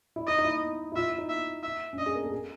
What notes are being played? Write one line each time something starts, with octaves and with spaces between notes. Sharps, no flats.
E4
D#4 D#5
D#4
E4
E4
F4 E5
E4
D#4
E5
E5
C#4
D4 D#5
G#4
A#4
A4
G#4